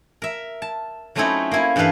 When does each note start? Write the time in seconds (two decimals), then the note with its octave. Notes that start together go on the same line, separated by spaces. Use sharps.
0.22 A#4 E5
0.62 A5
1.15 F#3 A3 C4 C#4 D#4 E4
1.51 A#3 E4 G#5
1.76 G2 E3 G3 A4 B4 F5